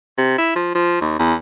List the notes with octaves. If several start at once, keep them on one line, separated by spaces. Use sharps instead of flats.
C3
E4
F3
F3
D#2
E2